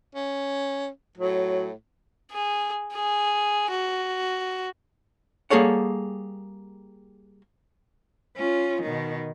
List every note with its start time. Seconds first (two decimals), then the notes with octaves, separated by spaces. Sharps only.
0.15 C#4
1.18 A2 F#3
2.32 G#4
2.93 G#4
3.70 F#4
5.50 G3 A#3 G#4 A4 C#5 F#5
8.37 C#4 F4
8.82 B2 D#3